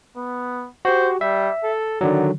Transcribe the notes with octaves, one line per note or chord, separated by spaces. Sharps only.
B3
F#4 G4 C5
G3 E5
A4
D3 D#3 F#3 D5